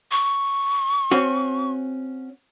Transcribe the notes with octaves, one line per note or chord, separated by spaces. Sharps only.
C#6
C4 C#4 F#4